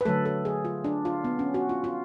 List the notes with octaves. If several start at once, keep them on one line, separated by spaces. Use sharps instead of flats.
B4
D3 F#3 A3 A4
A4
G#4
F4
D4
F4
B3
C#4
F#4
F4
F4